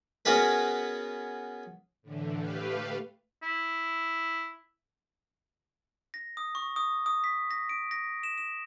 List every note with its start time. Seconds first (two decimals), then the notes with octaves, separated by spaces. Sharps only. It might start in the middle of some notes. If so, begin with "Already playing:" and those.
0.25 B3 C#4 F#4 G#4 A#4 B4
2.02 A2 D3 E3
2.37 A3 G4 B4 F5
3.43 E4
6.14 A#6
6.37 D#6
6.55 C#6
6.76 D#6
7.06 D#6
7.24 B6
7.51 A#6
7.69 D7
7.91 A#6
8.23 E7
8.38 E7